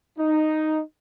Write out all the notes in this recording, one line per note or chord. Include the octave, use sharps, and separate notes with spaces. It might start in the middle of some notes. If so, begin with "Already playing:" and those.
D#4